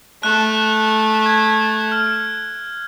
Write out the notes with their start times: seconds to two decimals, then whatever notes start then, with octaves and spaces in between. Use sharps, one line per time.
0.23 A3 F#6
1.26 G#6
1.92 F6